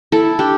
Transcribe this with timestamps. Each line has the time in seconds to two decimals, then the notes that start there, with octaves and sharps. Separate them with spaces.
0.12 E4 A4
0.39 D4 G4